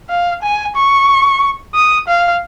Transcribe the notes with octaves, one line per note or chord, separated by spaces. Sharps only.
F5
G#5
C#6
D#6
F5